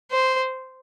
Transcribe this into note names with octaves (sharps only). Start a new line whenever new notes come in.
C5